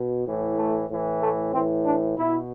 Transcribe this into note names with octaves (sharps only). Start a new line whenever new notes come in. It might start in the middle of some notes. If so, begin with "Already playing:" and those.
Already playing: B2
A2 E3
A3
A2 E3
A3
A2 E3 C4
D4
B2 E4